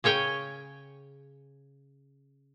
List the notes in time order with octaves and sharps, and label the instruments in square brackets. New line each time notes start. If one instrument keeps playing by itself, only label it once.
[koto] C#3 C#4 C#5 G5 G#5